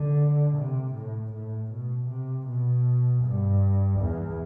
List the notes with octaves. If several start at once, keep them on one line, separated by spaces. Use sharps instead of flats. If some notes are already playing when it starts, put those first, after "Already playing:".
Already playing: D3
C3
A2
A2
B2
C3
B2
G2
E2